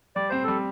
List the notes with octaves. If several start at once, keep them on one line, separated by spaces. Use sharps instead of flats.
G3 D5
C4 C5
G3 A4